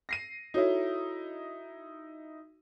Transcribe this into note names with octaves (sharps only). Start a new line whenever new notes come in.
A#6 C7 D#7
D#4 E4 F#4 A4 C#5